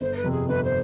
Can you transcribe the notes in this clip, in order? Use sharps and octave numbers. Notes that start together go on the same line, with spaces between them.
G1 C5
B4
F2 C3
G#4
G1 B4
C5